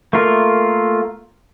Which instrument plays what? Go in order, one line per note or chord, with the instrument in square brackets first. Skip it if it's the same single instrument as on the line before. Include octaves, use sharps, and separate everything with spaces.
[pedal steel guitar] A3 A#3 F4 A#4